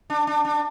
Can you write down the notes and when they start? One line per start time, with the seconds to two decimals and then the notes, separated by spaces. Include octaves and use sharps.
0.10 D4
0.27 D4
0.45 D4